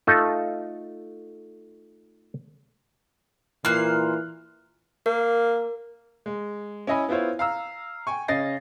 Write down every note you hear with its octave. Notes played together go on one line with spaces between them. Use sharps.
A3 D#4 F4 A4 A5
A#2 E3 A#3 C6 F6 F#6
A#3 A#4
G#3
C#4 E4 D#5 G#5 B5
B3 E4 F4 C5 C#5
F5 A#5 E6
G5 G#5 C#6
C#3 C#4 D#5 A6 A#6 C7